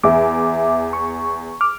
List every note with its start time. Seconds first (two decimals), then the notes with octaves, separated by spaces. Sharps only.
0.04 E2 E5 D6
0.93 C#6
1.61 D6 F6